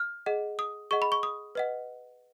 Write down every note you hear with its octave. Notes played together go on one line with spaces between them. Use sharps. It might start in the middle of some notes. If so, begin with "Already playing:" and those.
Already playing: F6
G#4 D#5 F#5
D#6
G#4 D#5 F#5 C#6
B5
C#6
D#6
B4 D#5 F#5